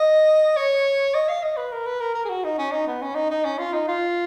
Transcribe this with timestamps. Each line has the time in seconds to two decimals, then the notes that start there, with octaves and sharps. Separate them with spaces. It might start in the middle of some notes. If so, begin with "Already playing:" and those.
Already playing: D#5
0.56 C#5
1.14 D#5
1.29 F5
1.43 D#5
1.57 B4
1.72 A#4
1.86 B4
2.00 A#4
2.14 A#4
2.25 G#4
2.29 F#4
2.44 D#4
2.58 C#4
2.72 D#4
2.87 B3
3.02 C#4
3.15 D#4
3.30 D#4
3.45 C#4
3.59 F4
3.73 D#4
3.88 F4